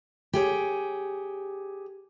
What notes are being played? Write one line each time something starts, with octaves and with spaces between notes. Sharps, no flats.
G4 G#4 C#5